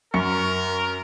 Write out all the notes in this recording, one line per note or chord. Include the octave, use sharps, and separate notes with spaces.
F#2 A#4 C#6 C#7